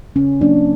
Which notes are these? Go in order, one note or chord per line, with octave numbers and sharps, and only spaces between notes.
C#3 C#4
F#3 A#3 D4